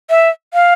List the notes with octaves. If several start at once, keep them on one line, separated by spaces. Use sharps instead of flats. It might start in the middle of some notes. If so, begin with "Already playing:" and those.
E5
F5